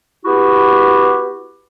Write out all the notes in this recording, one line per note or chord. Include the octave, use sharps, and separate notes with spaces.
B3 E4 F#4 G4